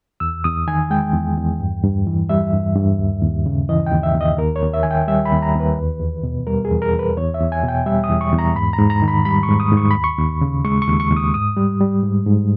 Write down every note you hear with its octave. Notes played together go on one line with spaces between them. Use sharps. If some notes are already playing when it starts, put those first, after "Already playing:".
E2 E6
E2 D#6
D#3 G#5
G#3 G5
E2
E2
G2
G2
E3
G3 E5
G2
G2
D#2
D#2
C#3
E3 D#5
G5
D#2
E5
D#2
D#5
D#2 A#4
C#5
D#2
E5
D#3 G#5
G5
G3 E5
B5
D#2
A#5
D#2
B4
E2
E2
B2
G3 A#4
G#4
E2
A#4
E2
B4
E2 C#5
E5
E2
G#5
B2
G5
G3 E5
D#6
E2
C#6
E2
A#5
G#2 B5
A#5
G#2
A#5
D#3
B5
G3 B5
C#6
G#2
D#6
G#2
C#6
D#2 B5
C#6
D#2
C#3
G#3 C#6
C#6
D#2
C#6
D#2
D#6
G#2 D#6
G3
G3
G#2
G#2